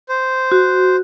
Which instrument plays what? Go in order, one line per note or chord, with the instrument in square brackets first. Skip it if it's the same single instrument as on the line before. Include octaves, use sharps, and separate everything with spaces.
[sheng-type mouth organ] C5
[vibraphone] F#4